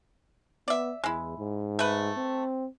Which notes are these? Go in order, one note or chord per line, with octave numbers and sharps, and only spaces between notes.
B3 D5 E5
E2 G#3 E4
G#2
A3 B4
C4